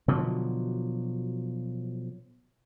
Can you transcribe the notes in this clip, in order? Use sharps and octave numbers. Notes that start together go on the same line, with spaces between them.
B2 D3 F3 F#3